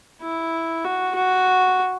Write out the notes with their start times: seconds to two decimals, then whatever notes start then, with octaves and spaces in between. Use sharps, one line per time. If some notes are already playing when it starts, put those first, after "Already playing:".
0.22 E4
0.84 F#4
1.15 F#4